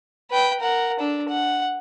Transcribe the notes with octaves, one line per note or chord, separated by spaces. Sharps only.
B4 G5
A#4 F#5
D4 A4
F#5